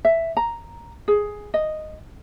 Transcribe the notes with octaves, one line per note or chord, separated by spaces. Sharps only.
E5
A#5
G#4
D#5